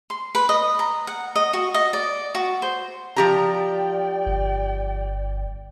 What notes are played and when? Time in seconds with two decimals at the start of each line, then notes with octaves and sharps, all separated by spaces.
0.10 C6
0.35 B4
0.49 D#5
0.79 A#5
1.07 F#5
1.35 D#5
1.53 F#4
1.74 D#5
1.93 D5
2.35 F#4
2.62 C5
3.16 F3 G4 D5 G5 A#5
4.26 G1